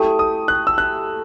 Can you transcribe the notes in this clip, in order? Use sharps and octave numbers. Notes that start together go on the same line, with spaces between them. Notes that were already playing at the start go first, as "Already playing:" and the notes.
Already playing: A3 E4 G4 D#6
D#6
F#6
E6
F#6